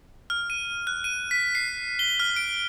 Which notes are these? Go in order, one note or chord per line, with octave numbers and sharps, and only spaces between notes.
F6
D#7
F#6
D#7
B6
C7
G7
F6
D7